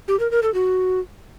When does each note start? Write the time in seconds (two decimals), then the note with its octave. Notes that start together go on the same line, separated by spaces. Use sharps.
0.08 G4
0.20 A#4
0.31 A#4
0.43 A4
0.54 F#4